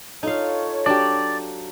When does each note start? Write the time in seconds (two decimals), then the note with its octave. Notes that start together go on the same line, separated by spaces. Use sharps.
0.23 D#4 F4 A4 C#5 F5
0.86 F#3 D4 G4 D5